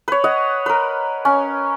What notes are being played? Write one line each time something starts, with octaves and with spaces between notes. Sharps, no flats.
B4 C#5
C#5 D#5 F#5
A#4 B4
C#4